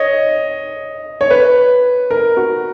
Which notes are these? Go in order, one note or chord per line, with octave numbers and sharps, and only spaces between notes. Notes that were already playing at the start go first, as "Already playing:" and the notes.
Already playing: C#5 D#5
C#5
B4
A#4
F#4